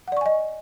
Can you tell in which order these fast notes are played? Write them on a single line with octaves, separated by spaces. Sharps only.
F#5 D5 C#6 G#5 D#5